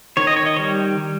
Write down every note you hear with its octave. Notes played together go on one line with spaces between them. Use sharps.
D#3 C#5
D#5
C#5
D#5
G3 C#5